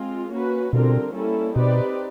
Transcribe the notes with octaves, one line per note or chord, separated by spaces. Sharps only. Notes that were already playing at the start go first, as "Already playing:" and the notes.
Already playing: G#3 C4 F4
A#3 C#4 F#4 B4
B2 D3 G3 C4 F4 A#4
G3 A#3 C#4 E4 A4
B2 C4 D#4 G4 B4 D5